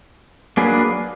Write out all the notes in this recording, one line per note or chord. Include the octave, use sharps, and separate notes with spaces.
F#3 A#3 D4 G#4 B4